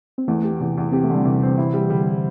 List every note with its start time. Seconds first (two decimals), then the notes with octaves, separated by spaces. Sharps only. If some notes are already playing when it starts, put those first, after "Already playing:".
0.18 C4
0.28 E2 E3 A3
0.44 G4
0.60 E2 C3 E3
0.78 E2
0.92 C4 G4
1.04 A3
1.10 D3 G3
1.25 E2 C3 E3
1.42 C4
1.58 E4
1.74 G3
1.90 D3 G3